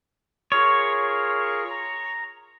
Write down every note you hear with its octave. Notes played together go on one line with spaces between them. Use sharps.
F4 G#4 A#4 C#5
A#5